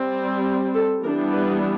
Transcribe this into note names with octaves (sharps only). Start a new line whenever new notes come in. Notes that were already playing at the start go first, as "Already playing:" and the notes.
Already playing: G3 C4
A4
E3 G3 B3 D4 A#4
B4